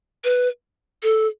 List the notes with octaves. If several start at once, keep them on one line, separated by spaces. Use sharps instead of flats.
B4
A4